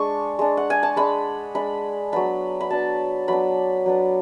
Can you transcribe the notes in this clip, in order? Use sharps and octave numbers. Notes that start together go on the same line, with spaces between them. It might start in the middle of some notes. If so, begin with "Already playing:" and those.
Already playing: G#3 D4 C#6
G#3 D4
F#5
G#5
A5
G#3 D4 B5
G#3 D4 B5
F#3 B3 D4 B5
B5
F#3 B3 D4 A5
F#3 B3 D4 B5
F#3 B3 D4